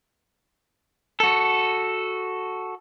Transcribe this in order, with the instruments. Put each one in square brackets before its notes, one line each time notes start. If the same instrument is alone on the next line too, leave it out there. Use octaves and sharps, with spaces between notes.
[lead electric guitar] F#4 A4